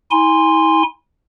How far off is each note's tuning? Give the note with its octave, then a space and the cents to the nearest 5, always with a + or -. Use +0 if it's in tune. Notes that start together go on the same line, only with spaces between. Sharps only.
E4 -40 G#5 -15 C6 +0